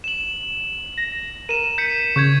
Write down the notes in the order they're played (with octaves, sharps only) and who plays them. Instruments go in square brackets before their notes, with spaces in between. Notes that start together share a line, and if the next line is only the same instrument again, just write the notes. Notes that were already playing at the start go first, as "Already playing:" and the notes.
[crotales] E7 F#7
[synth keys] A#6
[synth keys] A#4 [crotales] D#7 E7
[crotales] G6 B6 C#7
[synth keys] C#3 [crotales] C#6 G6 G#6